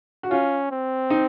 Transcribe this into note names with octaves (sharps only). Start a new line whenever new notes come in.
F#4
C#4 F4
C4
D#4